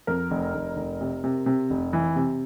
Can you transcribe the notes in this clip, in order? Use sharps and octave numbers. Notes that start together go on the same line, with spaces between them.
F2 A#4
F1
F1
F1
C3
C3
C3
F1
E3
C3